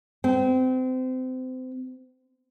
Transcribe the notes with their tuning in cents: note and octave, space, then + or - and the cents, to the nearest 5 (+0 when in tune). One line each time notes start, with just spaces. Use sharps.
C4 -30